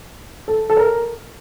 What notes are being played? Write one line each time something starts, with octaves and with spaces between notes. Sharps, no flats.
A4
A4
A#4